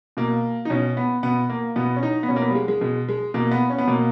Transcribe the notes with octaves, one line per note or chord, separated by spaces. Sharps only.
B2 A#3
D#4
B2 C#4
B3
B2 B3
A#3
B2 B3
C#4
D#4
B3
B2 C#4
A#3
B3
G3
G#3
G#3
B2 G#3
G#3
B2 A#3
B3
C#4
B3
B2 A#3